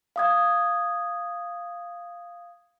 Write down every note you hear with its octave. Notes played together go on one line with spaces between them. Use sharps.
F5 D#6 G#6